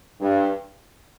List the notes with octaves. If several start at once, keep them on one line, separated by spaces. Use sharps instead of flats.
G2